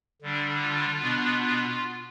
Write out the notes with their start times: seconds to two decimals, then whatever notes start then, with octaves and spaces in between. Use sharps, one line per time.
0.22 D3 G3 D4
0.62 F4
1.01 B2 B3 D4
1.42 F4